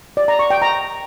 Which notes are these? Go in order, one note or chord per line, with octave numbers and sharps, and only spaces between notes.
D5
A#5
C#6
G5
A#5